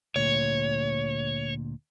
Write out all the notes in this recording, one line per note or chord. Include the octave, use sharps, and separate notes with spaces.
D2 A#2 C#5